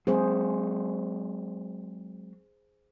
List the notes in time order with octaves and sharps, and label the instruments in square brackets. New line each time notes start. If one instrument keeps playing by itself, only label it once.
[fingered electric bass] F#3 G#3 C4 [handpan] G#4 C5